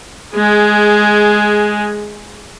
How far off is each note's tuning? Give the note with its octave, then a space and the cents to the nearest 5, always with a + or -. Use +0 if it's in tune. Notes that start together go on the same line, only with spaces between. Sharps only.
G#3 +10 G#4 +0